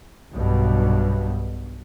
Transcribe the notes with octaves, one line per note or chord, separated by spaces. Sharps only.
B1 G2 B2